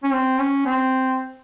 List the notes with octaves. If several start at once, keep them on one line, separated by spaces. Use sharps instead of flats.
C#4
C4
C#4
C4